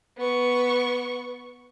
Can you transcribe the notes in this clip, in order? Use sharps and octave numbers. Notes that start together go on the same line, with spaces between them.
B3 C#6